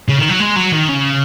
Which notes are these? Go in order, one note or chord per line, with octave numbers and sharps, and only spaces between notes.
C#3
D#3
F#3
G#3
F#3
D#3
C#3